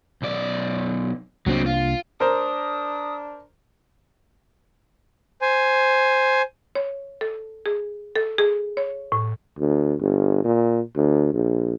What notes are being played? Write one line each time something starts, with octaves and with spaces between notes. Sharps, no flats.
B1 D5
C2 F#3 A#3 C4 D4
F4
D4 A#4 C5 D#6
C5 G#5
C#5
A4
G#4
A4
G#4
C#5
A2
D2
G1
A#2
D2
A#1